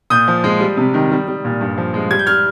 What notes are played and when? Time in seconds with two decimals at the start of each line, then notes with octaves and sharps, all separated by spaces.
0.10 A#2 D#6 G6
0.28 F3
0.44 G#3
0.60 G3
0.77 C3
0.94 D#3
1.11 G3
1.28 G3
1.45 A#2
1.61 G2
1.78 F3
1.94 G#3
2.10 G3 G#6
2.19 G6
2.26 G3 F6 G#6